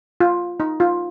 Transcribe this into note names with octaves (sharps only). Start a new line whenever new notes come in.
F4
D#4
F4